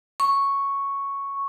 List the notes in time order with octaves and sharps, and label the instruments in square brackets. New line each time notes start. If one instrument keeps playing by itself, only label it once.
[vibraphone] C#6